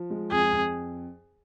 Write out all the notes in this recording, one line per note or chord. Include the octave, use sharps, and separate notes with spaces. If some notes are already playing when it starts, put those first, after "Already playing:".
Already playing: F3
G#3
F2 G#4
F2